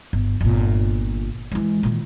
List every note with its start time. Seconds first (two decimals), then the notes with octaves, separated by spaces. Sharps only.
0.13 G1
0.41 G1 A#2
1.52 E3 G#3
1.83 A#2 D#3